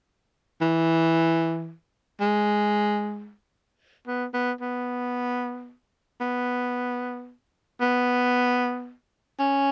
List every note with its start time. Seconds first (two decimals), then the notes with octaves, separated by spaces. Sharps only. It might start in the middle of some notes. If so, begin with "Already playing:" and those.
0.61 E3
2.21 G#3
4.07 B3
4.34 B3
4.61 B3
6.21 B3
7.81 B3
9.40 C#4